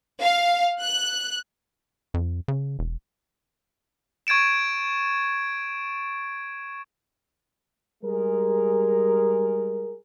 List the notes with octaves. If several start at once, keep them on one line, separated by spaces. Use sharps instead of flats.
F5
F#6
F2
C#3
E1
C#6 G#6 A6 D7 E7
G3 G#3 G#4 A#4